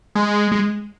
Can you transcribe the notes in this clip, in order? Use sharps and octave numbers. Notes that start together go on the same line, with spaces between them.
G#3
G#3